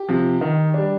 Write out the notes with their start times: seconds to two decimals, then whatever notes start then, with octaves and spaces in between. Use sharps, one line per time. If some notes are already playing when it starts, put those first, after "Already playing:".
Already playing: G4
0.09 C3 F3
0.41 D#3
0.74 G3 D4